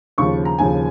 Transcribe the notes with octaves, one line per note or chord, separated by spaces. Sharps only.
D#2 C#3 F3 C#6
A#5
D#2 C#3 F3 G#5